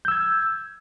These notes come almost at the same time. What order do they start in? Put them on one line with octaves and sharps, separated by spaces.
G6 E6 G#6